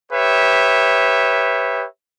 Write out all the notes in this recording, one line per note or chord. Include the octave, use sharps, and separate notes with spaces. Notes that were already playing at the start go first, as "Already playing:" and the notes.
G4 B4 C#5 E5